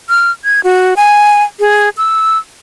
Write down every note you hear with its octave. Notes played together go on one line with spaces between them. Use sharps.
F6
G#6
F#4
G#5
G#4
E6